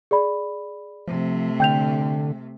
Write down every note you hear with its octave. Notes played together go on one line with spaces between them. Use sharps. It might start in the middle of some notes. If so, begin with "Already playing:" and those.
G#4 D5 B5
C3 F3 A3
D3 G5 G6 F7